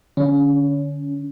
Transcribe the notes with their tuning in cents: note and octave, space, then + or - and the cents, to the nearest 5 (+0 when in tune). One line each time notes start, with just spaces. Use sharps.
D3 +5 C#4 +25